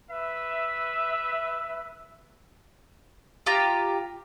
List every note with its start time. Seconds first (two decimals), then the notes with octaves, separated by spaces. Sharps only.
0.11 B4 E5
3.46 F4 G4 A#5